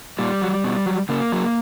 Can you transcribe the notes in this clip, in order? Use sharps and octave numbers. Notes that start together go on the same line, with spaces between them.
A#2 G3
F#3
B2
F#3
C#3 A#3
F#3